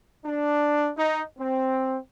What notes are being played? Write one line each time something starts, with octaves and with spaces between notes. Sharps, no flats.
D4
D#4
C4